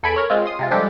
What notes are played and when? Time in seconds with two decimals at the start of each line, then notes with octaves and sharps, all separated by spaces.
0.03 E2 A4 G#5 B5 G#6 D7
0.15 A#4 C#5 B5
0.30 G#3 C4 F4
0.46 C6 D#6
0.59 C3 G#3 F4
0.71 F3 G3 G#3 D4 G4 A4